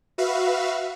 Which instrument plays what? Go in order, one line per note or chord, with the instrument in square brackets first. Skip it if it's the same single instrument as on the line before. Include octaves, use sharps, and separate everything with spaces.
[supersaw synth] F#4 B4 E5 F5